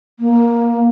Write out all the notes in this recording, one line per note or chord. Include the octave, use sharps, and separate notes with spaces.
A#3